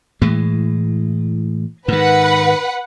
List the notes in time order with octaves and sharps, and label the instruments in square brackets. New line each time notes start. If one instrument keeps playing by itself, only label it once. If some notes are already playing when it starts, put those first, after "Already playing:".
[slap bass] A2 E3 G#3
[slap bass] G#2 D#3 [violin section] B4 F#5